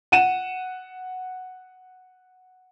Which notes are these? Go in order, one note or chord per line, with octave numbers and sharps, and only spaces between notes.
F#5 D#7 E7